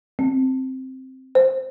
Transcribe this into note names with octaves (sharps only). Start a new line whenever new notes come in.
C4
C5